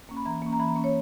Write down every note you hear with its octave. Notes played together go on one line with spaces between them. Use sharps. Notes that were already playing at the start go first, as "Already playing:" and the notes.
A#3 C#4
B5
E3 A#5
A#3 C#4
A#5
E3 B5
A#5
A#3 C#4
C#5